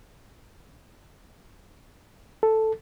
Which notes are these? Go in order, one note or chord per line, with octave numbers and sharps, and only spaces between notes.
A4